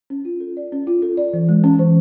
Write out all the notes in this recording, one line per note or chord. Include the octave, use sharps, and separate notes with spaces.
C#4
F4
A4
D5
C#4
F4
A4
D5
E3
G#3
C#4
E3